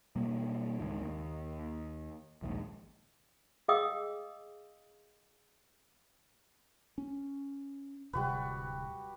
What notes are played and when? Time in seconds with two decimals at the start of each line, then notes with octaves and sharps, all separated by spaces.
0.16 B2 G3 A#3
0.80 C#2 G#2 D#3
1.01 D#2
2.42 A#1 D#2 G#2
3.68 G#4 D#5 F5 G5 D#6 E6
6.98 C#4
8.13 D1 C3 G3 F#4 B4